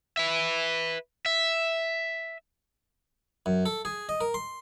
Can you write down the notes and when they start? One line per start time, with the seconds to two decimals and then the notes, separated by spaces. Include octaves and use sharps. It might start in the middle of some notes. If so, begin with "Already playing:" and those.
0.17 B4 E5
1.26 E5
3.46 F#2
3.66 A4
3.85 G#4
4.09 D#5
4.21 A#4
4.34 C6